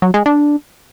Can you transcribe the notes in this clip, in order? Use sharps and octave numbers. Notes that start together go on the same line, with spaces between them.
F#3
G#3
D4